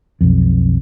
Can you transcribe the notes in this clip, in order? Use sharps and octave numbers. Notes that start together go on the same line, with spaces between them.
B1 F2